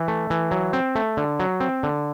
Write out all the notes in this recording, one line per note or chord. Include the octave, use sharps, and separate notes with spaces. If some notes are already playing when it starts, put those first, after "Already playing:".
Already playing: E3
A3
E3
F#3
C4
A3
D3
F#3
C4
D3